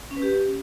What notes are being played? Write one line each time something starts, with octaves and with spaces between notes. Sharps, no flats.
C#4
B4
G4